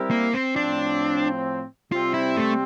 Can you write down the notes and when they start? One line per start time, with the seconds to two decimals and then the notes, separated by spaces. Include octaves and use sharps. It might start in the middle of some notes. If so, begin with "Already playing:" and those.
Already playing: G3 C4 E4 G4 A#4
0.11 A#3
0.34 C4
0.56 A2 F3 C4 D4
1.92 C3 G3 C4 F4
2.14 E4
2.37 A3